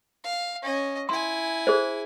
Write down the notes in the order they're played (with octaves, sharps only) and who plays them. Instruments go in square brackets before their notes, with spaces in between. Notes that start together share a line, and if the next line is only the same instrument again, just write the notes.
[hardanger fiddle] F5
C#4 D#5
[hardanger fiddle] E4 G#5 [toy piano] C6
[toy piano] G#4 C5